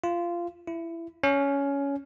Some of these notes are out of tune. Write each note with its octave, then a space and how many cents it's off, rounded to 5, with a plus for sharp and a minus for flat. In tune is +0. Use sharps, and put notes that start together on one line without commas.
F4 -15
E4 +20
C#4 +15